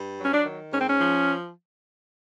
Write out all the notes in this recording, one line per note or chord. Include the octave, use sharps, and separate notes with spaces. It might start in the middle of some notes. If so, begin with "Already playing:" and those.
Already playing: G2
F#3
C#4
D4
D#3
G#2 C#4
C4
C#4
F3